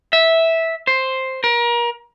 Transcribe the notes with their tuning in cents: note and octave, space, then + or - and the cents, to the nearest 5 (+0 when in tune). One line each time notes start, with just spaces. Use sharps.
E5 -10
C5 +5
A#4 +30